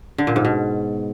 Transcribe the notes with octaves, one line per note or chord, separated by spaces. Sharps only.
D3
A#2
G#2
B2